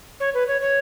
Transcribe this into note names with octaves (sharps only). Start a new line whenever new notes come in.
C#5
B4
C#5
C#5